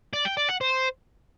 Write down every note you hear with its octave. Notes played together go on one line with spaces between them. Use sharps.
D5
G5
D5
F#5
C5